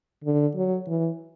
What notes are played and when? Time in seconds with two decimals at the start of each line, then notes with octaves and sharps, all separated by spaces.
0.24 D3
0.56 F#3
0.87 E3